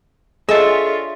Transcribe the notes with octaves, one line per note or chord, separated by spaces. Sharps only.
D4 F4 G#4 A4 C#5 D#5 E5 A6